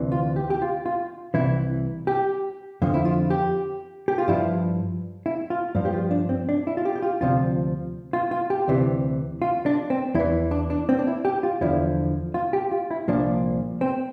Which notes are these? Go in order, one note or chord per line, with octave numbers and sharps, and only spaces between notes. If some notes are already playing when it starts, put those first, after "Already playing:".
Already playing: D2 C3 E3
F4
G4
G4
F4
F4
C2 C3 E3 E4
G4
F2 D3 F3
E4
F4
G4
G4
F4
G2 F3 E4
E4
F4
G2 F3
G4
F4
D4
C4
D4
E4
F4
G4
G4
F4
D2 C3 F3 F4
F4
F4
G4
D2 C3 E3
F4
D4
C4
E2 E4
E3
D4
D4
C4
D4
E4
G4
F4
E2 D3 F3 E4
F4
G4
F4
E4
C2 A#2 F3 D4
C4